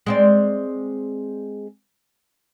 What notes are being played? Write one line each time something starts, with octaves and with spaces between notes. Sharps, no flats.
G#3 C4 D5